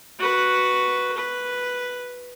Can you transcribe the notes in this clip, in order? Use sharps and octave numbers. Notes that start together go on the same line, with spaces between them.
F#4 B4
B4